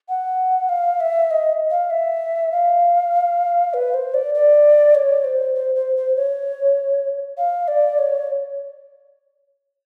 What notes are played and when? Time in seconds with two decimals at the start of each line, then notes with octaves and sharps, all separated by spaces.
0.09 F#5
0.69 F5
1.00 E5
1.31 D#5
1.70 F5
1.90 E5
2.52 F5
3.74 B4
3.94 C5
4.14 D5
4.34 D5
4.95 C#5
5.24 C5
5.55 C5
5.75 C5
5.96 C5
6.16 C#5
7.38 F5
7.68 D5
7.98 C#5